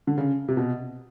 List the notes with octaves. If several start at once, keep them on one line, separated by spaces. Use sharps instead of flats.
D3
C#3
C3
B2